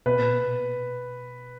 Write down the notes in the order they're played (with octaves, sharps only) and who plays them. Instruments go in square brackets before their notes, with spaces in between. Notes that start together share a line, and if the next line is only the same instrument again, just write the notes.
[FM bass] B2 [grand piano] B4
[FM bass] A#2
B2